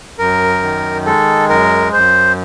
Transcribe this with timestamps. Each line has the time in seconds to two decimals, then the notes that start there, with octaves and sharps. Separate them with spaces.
0.18 F#2 A#4
0.62 D#3
1.06 G#3 A4
1.49 F#2 A#4
1.93 F#2 C5